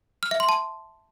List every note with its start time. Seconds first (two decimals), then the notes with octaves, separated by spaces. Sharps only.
0.23 F6
0.31 E5
0.40 C6
0.49 A5